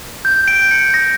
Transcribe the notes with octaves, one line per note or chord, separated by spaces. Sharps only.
G6
D7
C#7
A#6